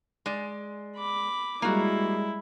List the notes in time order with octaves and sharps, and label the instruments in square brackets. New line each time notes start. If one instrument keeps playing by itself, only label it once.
[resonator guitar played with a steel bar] G#3 D5
[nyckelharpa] B5 D6
[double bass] G3 G#3 [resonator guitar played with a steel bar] A#3 F#4 [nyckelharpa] E4